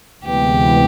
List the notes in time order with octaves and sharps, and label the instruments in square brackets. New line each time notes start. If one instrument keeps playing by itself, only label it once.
[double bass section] D2 C3 E3 G#3 B3 [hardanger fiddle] G4